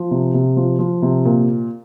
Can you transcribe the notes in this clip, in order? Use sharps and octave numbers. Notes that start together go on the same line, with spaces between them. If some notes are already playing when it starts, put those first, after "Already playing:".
Already playing: F3
C3
C3
F3
F3
C3
A#2